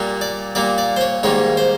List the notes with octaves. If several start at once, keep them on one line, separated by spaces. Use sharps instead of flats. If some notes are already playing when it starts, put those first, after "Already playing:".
Already playing: A#2 G3 A#3
D5
A#2 G3 A#3 D5
D5
C5
C#5
G#2 D#3 G3 A#3 C#5
C5